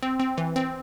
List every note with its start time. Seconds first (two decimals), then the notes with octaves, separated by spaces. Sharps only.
0.03 C4
0.20 C4
0.38 E3
0.56 C4